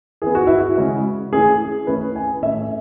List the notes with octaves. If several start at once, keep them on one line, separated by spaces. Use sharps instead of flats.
E3 B3 G#4
F#4
E4
F#4
C#3 G#3 C#4
E3 A3 C#4 G#4
E3 A3 C#4 B4
G#5
A2 E3 A3 C#4 E5